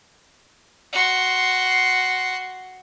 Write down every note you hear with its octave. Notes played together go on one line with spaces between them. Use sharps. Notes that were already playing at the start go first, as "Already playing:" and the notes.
F#4 C6